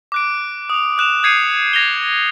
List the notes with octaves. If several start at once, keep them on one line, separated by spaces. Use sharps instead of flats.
D6 F#6 D7
D#6 F7
D#6 F#6 E7 F7
D#6 G6 G#6 C7 C#7 D#7
G#6 A#6 F7 G7